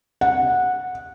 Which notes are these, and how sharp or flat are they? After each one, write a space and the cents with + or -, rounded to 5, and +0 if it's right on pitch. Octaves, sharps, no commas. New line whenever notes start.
F#5 -15